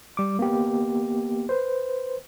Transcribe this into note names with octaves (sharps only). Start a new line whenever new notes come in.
G3 D6
A#3 B3 G4
B4 C5